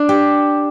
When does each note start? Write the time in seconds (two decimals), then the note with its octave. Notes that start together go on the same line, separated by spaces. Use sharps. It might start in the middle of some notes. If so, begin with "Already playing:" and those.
Already playing: D4
0.09 G4